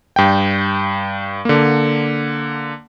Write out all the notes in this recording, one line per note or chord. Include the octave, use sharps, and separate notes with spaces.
G2 G5
D3 A#3